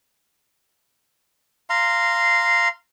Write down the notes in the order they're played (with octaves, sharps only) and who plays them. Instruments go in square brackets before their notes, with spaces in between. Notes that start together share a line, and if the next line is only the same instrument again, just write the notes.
[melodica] F5 A#5 C6